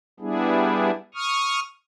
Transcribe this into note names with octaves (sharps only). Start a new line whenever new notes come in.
G3 B3 D4 E4 G#4
C#6 D#6 F6